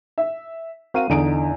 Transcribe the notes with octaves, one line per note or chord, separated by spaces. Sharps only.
E5
C4 F#4 A#4 F5 D#7
E2 D3 D#4 D#5 D7